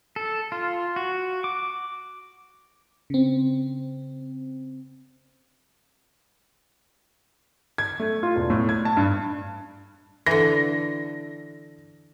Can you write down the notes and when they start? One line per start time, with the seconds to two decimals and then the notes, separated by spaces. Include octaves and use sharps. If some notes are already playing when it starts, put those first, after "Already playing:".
0.16 A4
0.52 F4
0.96 F#4
1.44 D6
3.10 C#3 C4
7.78 G#6
8.00 A3
8.23 F4
8.36 E1
8.50 A2
8.69 G#6
8.85 A5
8.97 G2
10.26 D3 E3 A#6